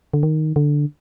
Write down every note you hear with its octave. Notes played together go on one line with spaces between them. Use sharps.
D3
D#3
D3